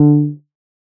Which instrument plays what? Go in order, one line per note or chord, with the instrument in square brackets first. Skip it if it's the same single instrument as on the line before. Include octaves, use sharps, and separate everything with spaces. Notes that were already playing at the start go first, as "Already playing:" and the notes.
Already playing: [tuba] D3